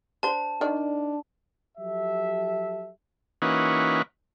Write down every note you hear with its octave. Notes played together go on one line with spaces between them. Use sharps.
D4 C5 A5
D#3 D4 D5
F3 F#3 G4 A4 E5
E3 A#3 C#4 D#4 F#4 B4